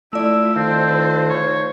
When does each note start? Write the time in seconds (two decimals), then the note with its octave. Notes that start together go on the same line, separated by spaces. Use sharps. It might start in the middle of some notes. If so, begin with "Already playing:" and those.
0.13 A3 E4 F4 D5 E6
0.56 D#3 C4 F4 A4 C5
1.29 C#5